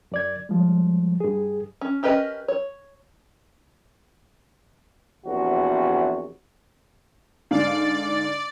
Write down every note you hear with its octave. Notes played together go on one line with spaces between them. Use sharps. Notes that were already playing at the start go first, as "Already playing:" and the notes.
F#2 D5 G#6
F3 G3 G#3
G2 G#4
C#4
C#4 G4 A#4 B4 D#5
C#5
A#1 E2 C3 F#4
G#2 D3 D5 F5